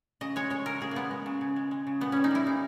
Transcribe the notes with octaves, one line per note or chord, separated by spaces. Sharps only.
C#3 D#5
G#3 C#5
G#3 C#5
C#3 A#4
C#3 G#4
G#3 A#3 B3
G#3
C#3
C#3
G#3
G#3
C#3
A#2 B3
G3 C#4
D#4
G3 E4
A#2 D#4